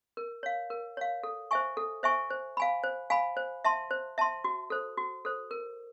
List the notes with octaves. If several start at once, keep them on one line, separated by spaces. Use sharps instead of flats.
A#4
C#5 F5
A#4
C#5 F5
A4
C5 E5 G#5 C#6
A4
C5 E5 G#5 C#6
C5
F5 G#5 B5
C5
F5 G#5 B5
C5
E5 A5 C6
C5
E5 A5 C6
F#4
A4 C5
F#4
A4 C5
A#4